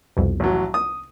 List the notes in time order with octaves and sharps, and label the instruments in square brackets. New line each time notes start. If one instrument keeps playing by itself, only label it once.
[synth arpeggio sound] C2 F2 B2
[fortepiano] A1 F#3
D#6